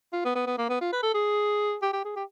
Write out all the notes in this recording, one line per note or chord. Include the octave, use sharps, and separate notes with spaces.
F4
B3
B3
B3
A#3
B3
F4
B4
A4
G#4
G4
G4
G#4
G4